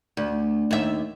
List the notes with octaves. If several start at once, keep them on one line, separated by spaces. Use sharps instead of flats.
D2
D#2 E5